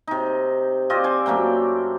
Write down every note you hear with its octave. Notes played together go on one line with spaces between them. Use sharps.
C3 D#4
C4 F4 D5 D#5
C5 G#5 D6
F#2 A3 A#3 G5